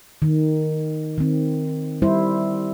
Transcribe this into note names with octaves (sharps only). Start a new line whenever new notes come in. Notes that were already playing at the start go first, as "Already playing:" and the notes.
D#3
D#3 C4
G3 E4 C5